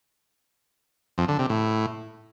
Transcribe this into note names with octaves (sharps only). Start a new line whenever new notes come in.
F2
D3
C3
A2